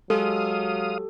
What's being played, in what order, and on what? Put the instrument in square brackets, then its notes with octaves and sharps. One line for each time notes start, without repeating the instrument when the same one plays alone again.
[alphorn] F#3 [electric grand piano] G#3 [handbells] G4 A4 [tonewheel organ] F5 D#6